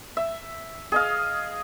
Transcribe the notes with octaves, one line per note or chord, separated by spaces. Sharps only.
E5
G#4 D#5 F5